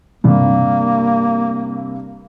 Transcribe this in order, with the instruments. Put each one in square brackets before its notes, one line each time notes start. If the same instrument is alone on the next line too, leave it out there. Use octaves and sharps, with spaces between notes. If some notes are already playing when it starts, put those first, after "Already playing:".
[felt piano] G2 C3 [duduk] A#3